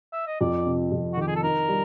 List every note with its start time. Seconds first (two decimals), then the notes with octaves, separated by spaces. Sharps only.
0.13 E5
0.27 D#5
0.40 F2 D5
0.66 C3
0.92 F2
1.13 F#4
1.17 D#3 G4
1.27 G#4
1.35 A4
1.43 D#4 A#4
1.68 G3